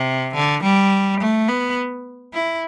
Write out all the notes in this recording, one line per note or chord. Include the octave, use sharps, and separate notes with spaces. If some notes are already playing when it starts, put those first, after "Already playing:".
Already playing: C3
D3
G3
A3
B3
E4